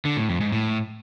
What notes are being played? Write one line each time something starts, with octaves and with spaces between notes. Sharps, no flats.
D3
A2
F2
G#2
A2